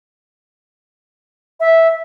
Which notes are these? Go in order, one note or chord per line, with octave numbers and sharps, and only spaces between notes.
E5